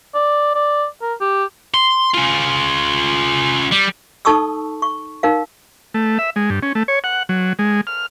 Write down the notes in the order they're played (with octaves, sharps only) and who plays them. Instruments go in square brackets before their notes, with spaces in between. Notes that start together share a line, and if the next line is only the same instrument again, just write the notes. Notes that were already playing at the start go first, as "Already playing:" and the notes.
[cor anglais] D5
D5
A#4
G4
[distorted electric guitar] C6
C#4 F4
G3
[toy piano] D#4 A4 A5 C#6 D#6 E6
C#6
D#4 A#4 F5
[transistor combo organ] A3
E5
G#3
G2
C#4
A3
C#5
F#5
F#3
G#3
F6